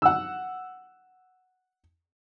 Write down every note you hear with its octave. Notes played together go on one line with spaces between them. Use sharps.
F#5 E6